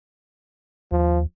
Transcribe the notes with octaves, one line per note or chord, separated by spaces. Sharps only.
D#2 F3